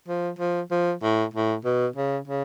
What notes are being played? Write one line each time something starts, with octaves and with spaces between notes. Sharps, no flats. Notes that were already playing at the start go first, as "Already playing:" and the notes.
F3
F3
F3
A2
A2
B2
C#3
C#3